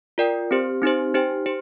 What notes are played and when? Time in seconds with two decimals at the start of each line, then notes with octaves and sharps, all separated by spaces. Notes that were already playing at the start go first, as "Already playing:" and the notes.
0.18 F4 A#4 D5 G5
0.51 C4 G4 C5
0.82 C4 D#4 G4 C5
1.14 D#4 G4 C5 G5
1.46 G4 C5